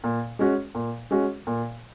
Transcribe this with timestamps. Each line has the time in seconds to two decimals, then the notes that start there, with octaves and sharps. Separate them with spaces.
0.04 A#2
0.39 G#3 C#4 F#4
0.75 A#2
1.11 G#3 C#4 F#4
1.47 A#2